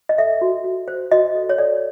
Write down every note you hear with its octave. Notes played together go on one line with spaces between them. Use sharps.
D#5
A4 E5
F#4
F#4
C5
F#4 D#5
A4
C#5
A4 D5